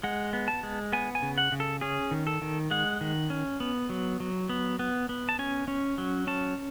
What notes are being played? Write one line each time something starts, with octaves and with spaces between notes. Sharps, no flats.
G#3 F#5
B3
A5
G#3
B3 G#5
G#5
C#3
F#5
C#3
A4
C#4 G#4
D#3
A4
D#3
G#3 F#5
D#3
C#4
B3
F#3
F#3
B3
B3
B3
A5
C#4 G#5
C#4
F#3
C#4 A5